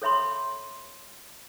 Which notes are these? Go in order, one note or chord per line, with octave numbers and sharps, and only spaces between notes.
A4 C#5 E5 B5 C6